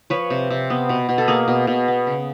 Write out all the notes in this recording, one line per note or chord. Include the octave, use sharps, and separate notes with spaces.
F3 B4 C#5
C3
C3
B3
B2
B2
A4
A#3 G#4 A#4
B2
B2
B3
C#3